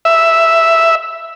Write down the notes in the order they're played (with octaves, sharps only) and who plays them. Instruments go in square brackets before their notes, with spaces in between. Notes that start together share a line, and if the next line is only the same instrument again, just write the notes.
[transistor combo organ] E5